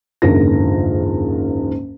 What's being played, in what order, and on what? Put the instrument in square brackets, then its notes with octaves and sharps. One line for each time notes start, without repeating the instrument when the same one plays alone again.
[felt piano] F#1 D#2 G#2 D3 F4 A#6